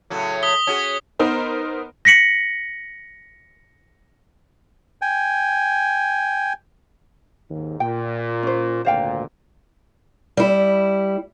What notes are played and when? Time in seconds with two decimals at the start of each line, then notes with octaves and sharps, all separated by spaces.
0.10 A2 C#3 F#3
0.43 D#6 B6 G7
0.67 C#4 F#4 G#4
1.19 B3 D#4 A#4 C5
2.05 A#6 B6 C#7 F#7
5.02 G5 G#5
7.50 D#2 G#2
7.80 A#2 G5
8.43 C#4 C5
8.85 G#1 D2 A#2 C5 F5 G5
10.37 G3 E4